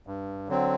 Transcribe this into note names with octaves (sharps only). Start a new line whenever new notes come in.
G2
D3 F#3 C4